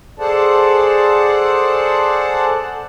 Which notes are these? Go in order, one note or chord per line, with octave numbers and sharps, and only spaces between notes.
G#4 A4 C5 D5 F#5 A5